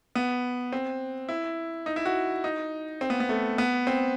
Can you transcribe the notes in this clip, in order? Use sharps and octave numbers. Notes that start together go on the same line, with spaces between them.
B3
C4
E4
D#4
E4
F#4
D#4
C4
B3
B3
A3
B3
C4